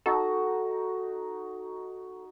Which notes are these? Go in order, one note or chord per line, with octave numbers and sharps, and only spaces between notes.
D#4 F#4 A4